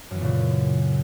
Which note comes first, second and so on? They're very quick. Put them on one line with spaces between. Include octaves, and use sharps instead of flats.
F#2 E3 B3 A#2 C#3